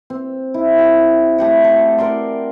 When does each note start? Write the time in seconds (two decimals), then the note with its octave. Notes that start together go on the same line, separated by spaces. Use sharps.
0.10 C4
0.54 E4
0.79 G4
1.38 A3 G4 F#5
1.64 A4
1.98 A#4 D5 C6